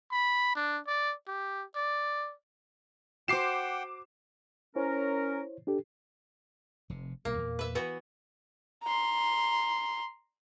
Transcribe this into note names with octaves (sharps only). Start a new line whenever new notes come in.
B5
D4
D5
G4
D5
F#4 C5 F#5 G5 D6 C7 E7
C#4 E4 A#4 C5 C#5
D4 G4 A4
F1 C3
B1 A#2 G3 A#3
E2 A#2
B4 E5
E3 B3 F#4
A#5 C6